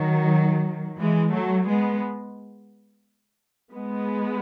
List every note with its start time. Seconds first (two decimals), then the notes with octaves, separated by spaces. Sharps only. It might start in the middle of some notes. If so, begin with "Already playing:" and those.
Already playing: D#3 F#3
1.01 E3 G#3
1.34 F#3 A3
1.68 G#3 B3
3.73 G#3 B3